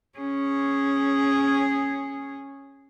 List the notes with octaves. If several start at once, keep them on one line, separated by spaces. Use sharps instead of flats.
C#4 G#4